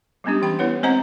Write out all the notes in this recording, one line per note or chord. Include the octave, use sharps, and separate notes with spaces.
G3 G#3 B3 C#4 D4 G4
E3 G5 B5
B3 E4 B4 C#5 F#5
G#3 C4 C5 D#5 F#5 A#5